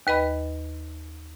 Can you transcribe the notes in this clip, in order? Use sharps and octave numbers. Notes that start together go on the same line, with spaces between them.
D#2 B4 D#5 B5